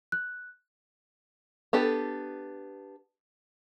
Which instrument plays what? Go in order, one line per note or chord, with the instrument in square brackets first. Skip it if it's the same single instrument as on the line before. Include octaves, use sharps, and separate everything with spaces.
[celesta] F#6
[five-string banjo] B3 D4 G4 A4